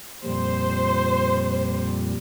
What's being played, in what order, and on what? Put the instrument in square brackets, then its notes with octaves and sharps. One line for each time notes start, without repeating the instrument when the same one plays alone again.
[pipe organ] F2 A#2 G3 [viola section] C5